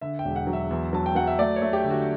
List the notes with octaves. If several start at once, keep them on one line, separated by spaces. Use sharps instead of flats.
D3 E5
G5
E1
F#5
F#3
E5
E2
F#3 A5
G5
F#3 F#5
E5
A3 D5
C#5
A3
G4
D3
F#4